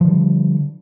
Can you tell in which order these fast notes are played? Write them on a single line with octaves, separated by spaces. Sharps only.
F3 D3 G3